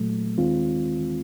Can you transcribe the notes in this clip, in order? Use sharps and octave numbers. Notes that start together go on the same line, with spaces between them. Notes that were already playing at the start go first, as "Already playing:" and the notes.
Already playing: A#2 F#3 A3
D#2 D#3 G#3 C4 F4